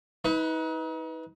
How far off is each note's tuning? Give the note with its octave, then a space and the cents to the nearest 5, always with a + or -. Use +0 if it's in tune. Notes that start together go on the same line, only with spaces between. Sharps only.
D#4 +40 B4 +0